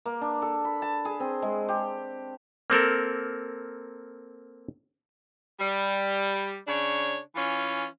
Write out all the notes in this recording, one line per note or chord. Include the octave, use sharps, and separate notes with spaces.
A#3
D4
A4
B5
A5
G#4
C4
G#3
G4
A#3 C4 A4 A#4
G3
C#3 D4 C#5
E3 C#4 F4